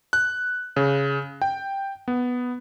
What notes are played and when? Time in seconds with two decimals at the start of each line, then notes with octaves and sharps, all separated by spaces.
0.13 F#6
0.76 C#3
1.42 G5
2.08 B3